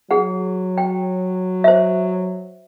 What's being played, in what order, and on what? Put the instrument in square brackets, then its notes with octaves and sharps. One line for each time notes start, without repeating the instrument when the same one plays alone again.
[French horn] F#3 [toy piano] G#4 F#5
[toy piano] G5
C5 E5